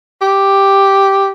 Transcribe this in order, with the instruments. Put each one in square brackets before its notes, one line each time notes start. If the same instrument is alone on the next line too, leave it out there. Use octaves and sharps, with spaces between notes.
[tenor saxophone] G4